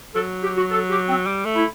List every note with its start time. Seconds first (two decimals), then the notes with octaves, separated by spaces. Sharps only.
0.15 F#3 A4
0.43 G4
0.57 F#4
0.71 A4
0.90 G4
1.09 C4
1.27 G3
1.45 A3
1.56 E4